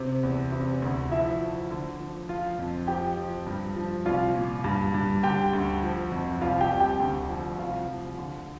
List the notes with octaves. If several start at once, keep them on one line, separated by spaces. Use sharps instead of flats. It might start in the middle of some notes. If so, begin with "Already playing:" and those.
Already playing: C3
E2
C3
D2
F3 E4 E5
F3
D3
F3
F3 F4 F5
F2
F3 G4 G5
F3
G2
F3
C2 F4 F5
A#2
G2
G2
D3 G4 G5
D2
F3
F2
C2 F4 F5
G4 G5
C2
G4 G5
D2
F3
C2 F4 F5
F3
D3